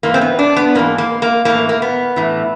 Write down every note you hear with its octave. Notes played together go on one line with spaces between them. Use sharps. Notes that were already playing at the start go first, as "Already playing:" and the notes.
G#2 E3 A#3
C4
B3
D4
B3
G#2 E3 A#3
A#3
A#3
A2 E3 A#3
A#3
B3
A2 E3